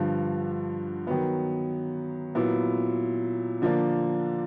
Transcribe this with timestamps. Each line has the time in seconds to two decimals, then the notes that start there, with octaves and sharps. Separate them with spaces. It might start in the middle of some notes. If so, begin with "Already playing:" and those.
Already playing: G2 D3 F3
1.07 D#3 F#3 B3
2.35 A#2 F#3 B3 E4
3.62 D3 F3 A#3 D4